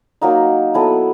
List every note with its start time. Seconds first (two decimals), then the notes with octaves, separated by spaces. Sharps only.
0.21 F#3 A#3 D#4
0.74 F#3 B3 E4 A4